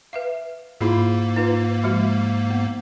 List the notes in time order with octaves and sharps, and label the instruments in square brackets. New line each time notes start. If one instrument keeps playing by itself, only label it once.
[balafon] B4 E5 F5
[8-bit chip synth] G#2 A#3 [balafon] E4 F4 G#4
[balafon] D#4 F4 B4
F3 G#3 F#4
B3